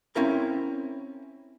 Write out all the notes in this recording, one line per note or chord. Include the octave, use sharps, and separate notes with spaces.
C4 C#4 E4 A#4 A5